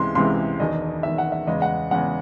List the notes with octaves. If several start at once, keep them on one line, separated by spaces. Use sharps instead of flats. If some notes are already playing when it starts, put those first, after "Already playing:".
Already playing: C#2 C3 E3 G#3 C6
C#2 C3 E3 G#3 C6
E1 E2 D#3 D#5
E1 E2 D#3 E5
F#5
E5
E2 C#3 G#3 D#5
F#5
E2 C#3 G#3 F#5